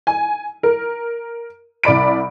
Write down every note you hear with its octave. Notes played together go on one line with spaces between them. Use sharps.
G#5
A#4
C2 D5 B5 D7